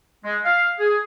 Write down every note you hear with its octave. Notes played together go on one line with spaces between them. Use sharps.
G#3
F5
G#4